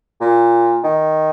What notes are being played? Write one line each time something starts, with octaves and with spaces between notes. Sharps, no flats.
A#2
D#3